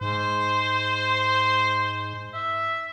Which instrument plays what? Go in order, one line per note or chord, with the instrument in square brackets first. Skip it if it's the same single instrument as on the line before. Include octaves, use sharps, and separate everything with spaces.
[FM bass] G#2 [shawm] C5
[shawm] E5